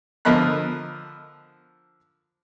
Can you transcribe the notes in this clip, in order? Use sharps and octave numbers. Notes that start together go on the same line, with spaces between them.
D3 F3 A#4 D#5 B5 F#6